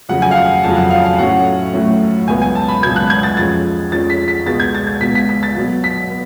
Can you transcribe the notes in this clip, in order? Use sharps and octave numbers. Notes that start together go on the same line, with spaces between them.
F2 C#3 F#3 F#5
G#5
F5
F#5
F2 C#3 F#3 A5
F#5
F5
F5
A2 F#3 A3 C#4 F#5
A2 F#3 A3 C#4
C#2 B2 F#3 B3 G#5
G#5
A5
B5
C#2 B2 F#3 B3 G#6
F#6
G#6
A6
F2 F3 G#3 C#4 A6
F2 F3 G#3 C#4 A6
B6
B6
C#2 B2 G#3 B3 A6
G#6
A6
G#6
C#2 B2 G#3 B3 B6
B6
B6
A6
B2 F#3 B3
B6
B3